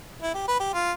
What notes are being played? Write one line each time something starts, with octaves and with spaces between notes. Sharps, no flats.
E4
G4
B4
G4
F4